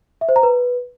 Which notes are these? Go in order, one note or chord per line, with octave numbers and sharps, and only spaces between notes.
E5
C5
A#5
B4